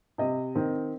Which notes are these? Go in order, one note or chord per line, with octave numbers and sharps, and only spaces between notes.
C3 D#5
D#3 C4